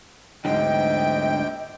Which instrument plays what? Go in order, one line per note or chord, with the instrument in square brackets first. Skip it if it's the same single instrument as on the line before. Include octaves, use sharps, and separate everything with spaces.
[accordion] D2 G5 [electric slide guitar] G#2 D3 [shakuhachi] D#5